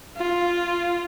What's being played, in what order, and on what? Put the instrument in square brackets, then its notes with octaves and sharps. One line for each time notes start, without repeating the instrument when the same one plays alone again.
[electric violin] F4